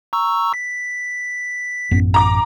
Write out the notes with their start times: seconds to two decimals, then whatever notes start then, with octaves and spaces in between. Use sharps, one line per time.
0.13 A#5 C#6 E6
0.54 B6
1.91 A1 F#2 B3
2.14 A#5 D6